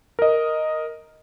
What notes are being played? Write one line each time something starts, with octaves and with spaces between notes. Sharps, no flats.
A#4 D#5